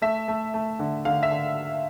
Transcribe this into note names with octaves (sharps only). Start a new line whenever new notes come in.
A3 E5
A3
A3
D3
D3 F5
E5
D3